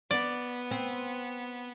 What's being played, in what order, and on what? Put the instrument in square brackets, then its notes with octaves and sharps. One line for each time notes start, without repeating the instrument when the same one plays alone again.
[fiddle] B3 [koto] D5
[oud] C4